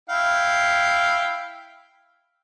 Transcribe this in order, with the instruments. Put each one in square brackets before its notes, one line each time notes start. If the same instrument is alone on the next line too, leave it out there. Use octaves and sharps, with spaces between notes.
[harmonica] E4 F5 G5